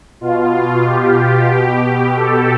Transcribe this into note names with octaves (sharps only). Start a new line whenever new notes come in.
B2 F4
G4
B2 G4
A4